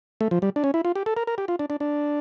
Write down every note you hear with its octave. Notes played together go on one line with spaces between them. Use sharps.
A3
F3
G3
D4
C#4
E4
F4
G4
A4
A#4
A#4
G4
F4
D4
D4
D4